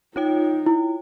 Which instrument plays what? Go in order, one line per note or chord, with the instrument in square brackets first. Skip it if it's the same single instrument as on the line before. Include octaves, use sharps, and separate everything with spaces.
[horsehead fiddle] D#4 [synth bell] F4 C#5 G5
[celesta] E4